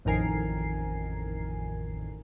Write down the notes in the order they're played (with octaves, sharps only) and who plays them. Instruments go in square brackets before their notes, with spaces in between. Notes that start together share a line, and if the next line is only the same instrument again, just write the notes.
[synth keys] A1 F2 D#3 A#4 G#5 C7